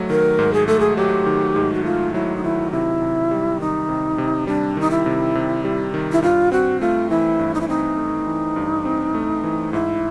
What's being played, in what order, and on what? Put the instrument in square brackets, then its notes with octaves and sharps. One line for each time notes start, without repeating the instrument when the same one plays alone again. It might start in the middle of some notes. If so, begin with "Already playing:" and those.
Already playing: [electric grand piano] G#2 F#3 A3
[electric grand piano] D#3 [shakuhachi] A#4
[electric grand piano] G#2
[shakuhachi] G#4
[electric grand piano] A3 [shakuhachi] A4
[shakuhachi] G#4
[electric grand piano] F#3 [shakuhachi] G4
[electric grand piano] D#3
G#2
[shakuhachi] F#4
[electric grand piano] A3 [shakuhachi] F4
[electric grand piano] F#3 [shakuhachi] E4
[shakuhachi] D#4
[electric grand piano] D#3 [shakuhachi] E4
[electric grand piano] C3 [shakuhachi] E4
[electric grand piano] C3
G3
[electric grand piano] D#3 [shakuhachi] D#4
[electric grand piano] C3
C3
[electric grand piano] G3 [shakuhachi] D4
[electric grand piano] D#3 [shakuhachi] D#4
[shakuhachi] E4
[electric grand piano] C3
C3
G3
D#3
[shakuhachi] E4
[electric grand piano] G2 [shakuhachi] F4
[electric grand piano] C4 [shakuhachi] F#4
[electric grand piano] A3 [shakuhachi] F4
[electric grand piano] E3 [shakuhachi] E4
[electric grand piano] G2
[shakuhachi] D#4
E4
[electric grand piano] C4 [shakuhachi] D#4
[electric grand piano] A3
E3
G2
C4
A3
E3
[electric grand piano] G#2 [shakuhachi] E4